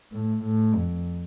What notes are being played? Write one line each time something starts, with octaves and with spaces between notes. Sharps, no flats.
A2
A2
F2